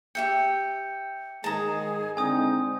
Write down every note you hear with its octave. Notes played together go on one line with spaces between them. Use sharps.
G4 E5 G5 C#7
G#2 D#3 G#3 G#4 A5 A#5
D3 G#3 C4 D#4 G#5 D#6